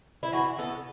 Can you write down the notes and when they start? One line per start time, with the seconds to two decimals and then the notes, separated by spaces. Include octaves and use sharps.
0.23 E4
0.32 E3 F#4
0.58 B3 A4